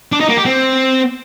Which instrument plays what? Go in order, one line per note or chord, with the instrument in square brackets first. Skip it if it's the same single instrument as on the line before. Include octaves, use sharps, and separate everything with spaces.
[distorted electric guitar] D4
D#4
A#3
G4
C4